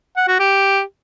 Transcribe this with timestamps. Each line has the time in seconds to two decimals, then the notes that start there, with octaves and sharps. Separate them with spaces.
0.16 F#5
0.28 F#4
0.39 G4